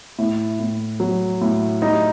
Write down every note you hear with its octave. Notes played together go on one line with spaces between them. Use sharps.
A2 E4
A2
F#3
A2
G3 D#4